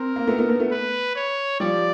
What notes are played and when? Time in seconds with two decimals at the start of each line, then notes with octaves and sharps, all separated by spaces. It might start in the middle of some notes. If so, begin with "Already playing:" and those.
Already playing: C4 A#4
0.16 A#3
0.27 A3 B3
0.38 A3 B3
0.49 A3 B3
0.60 A3 B3
0.71 B4
1.16 C#5
1.60 F3 G3 D5